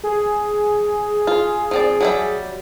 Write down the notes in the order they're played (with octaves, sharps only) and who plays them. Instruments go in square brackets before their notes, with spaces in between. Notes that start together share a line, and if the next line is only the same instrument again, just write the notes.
[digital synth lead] G#4
[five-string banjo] F4
F3 C4 D5
F#3 G3 E5